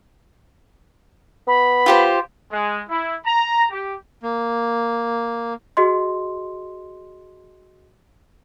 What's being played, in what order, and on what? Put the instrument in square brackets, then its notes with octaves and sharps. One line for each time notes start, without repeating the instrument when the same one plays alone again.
[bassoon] B3 [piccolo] B5
[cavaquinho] F4 G4 C5
[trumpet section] G#3
E4
A#5
G4
[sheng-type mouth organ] A#3
[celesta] F#4 G#4 D#5 C6